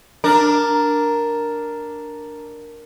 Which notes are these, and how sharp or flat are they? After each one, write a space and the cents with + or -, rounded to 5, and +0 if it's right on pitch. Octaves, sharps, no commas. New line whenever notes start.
D4 +0 A#4 +0